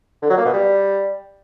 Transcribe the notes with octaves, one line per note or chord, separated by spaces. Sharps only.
D3
F#3
A#3
B2
G3